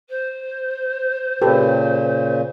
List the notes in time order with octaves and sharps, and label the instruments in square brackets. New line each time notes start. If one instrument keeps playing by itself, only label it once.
[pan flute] C5
[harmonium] A#2 C#3 [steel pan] G4 A4 B4